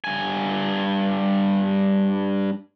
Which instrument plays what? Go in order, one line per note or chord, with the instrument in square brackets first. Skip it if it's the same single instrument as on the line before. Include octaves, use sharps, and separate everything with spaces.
[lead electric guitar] G2 G#5